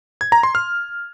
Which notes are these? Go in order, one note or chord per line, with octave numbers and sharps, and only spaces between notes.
G#6
A#5
C6
F6